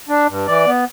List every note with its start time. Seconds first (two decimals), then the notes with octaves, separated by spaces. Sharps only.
0.09 D4
0.28 G2
0.47 E3 D5
0.66 B3